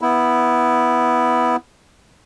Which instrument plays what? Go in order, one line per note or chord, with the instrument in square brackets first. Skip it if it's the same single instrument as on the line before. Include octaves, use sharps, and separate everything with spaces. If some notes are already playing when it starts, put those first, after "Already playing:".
[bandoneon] B3 E4